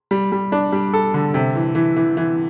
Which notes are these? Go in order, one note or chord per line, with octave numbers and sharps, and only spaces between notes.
G3
G3
D4
G3
A4
D3
C3
E3
E3
E3
E3